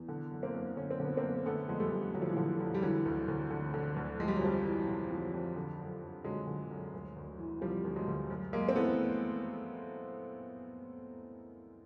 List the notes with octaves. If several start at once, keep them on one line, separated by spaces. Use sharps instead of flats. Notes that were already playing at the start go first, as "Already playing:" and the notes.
Already playing: E2
D3
F#2
A#3 C4
F#2
D3 C#4
C4
D3 B3
A#3 C4
F#2
D3 A3 B3
F2 G#3
G3 A3
F2
D3 F#3
F3
E3
D3 F3
F2
G3
D3 E3 F#3
D2
D2
D3
D3
D2
F2 G#3
G3
F#3
F2 F3 G3
E3
C3
F2
F2
D3
F#2
F#2
D3 F#3 G#3
D3
F#2
D2
D2
E3
C3 F3 G3
D2
F#3 G#3
D2
F#2
F#2 G#3 A#3
C4
E3 A3 B3